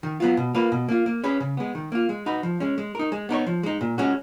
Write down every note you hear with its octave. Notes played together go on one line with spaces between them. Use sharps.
D#3
F#3 B3 F4
B2
A#3 F4 B4
B2
A#3 F4
A#3
C#4 G#4 B4
C#3
G#3 B3
D#3
A#3 F4
G#3
D#4 F#4 B4
F3
G#3 C#4
G#3
D#4 A#4
G#3
B3 D#4 A#4 C#5
F3
G#3 D#4
A#2
G#3 C#4 F#4